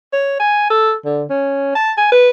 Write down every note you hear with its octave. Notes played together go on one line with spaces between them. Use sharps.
C#5
G#5
A4
D3
C#4
A5
G#5
B4